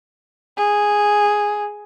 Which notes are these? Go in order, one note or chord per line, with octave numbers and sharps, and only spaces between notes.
G#4